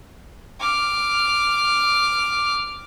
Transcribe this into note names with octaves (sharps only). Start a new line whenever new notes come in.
D6 F6